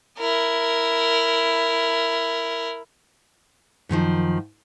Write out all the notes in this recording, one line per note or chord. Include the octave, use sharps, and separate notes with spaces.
E4 A#4
F#2 D3 D#3 F3